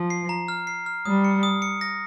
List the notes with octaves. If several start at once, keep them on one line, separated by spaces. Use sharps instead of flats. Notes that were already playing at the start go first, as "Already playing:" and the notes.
Already playing: F3
C7
A#5
F6
C7
F6
G3 D#6
C#7
D#6
C#7
A#6